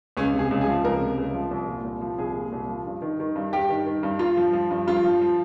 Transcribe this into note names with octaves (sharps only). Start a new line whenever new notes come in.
C#2 C#4
C3
G#4
C#2
G#4
F3
C#2 A#4
C3
C#2
F3
C2
A#2
C2
F3
C2 G#4
A#2
C2
F3
G2
D#3
D#3
G2
G2 G4
D#3
D#3
G2
G2 F4
F3
F3
G2
G2 F4
F3
F3